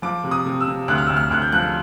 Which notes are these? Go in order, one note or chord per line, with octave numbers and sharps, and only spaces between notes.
F3 D6
C3
D#6
C3
E6
C3
D2 F#6
F6
D2 E6
F6
D2 F#6
G6
F3 F#6